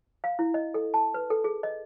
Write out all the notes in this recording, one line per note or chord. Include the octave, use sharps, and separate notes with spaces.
F5
E4
D#5
A4
A5
B4
A4
G#4
D#5